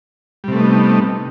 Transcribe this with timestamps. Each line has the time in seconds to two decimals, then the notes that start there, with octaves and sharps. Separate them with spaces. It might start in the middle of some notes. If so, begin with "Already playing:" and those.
0.44 G3
0.48 C3
0.52 A3
0.56 B3
0.60 D#4